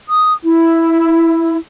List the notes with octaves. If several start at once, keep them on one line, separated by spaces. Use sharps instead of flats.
D#6
E4